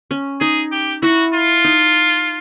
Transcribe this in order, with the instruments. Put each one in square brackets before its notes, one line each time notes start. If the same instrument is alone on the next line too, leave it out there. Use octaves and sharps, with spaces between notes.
[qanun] C#4
[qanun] D#4 [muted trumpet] G#4
[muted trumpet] G4
[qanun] E4 [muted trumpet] F#4
[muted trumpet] F4
[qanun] D#4